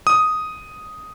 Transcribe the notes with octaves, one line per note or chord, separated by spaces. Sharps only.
D#6